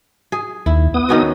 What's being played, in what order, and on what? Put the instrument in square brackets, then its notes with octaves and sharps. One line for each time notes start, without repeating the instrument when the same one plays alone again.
[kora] G#4
[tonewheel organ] D#2 [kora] E4
[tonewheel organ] B3 D#6
[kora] D#3 C#4 F#4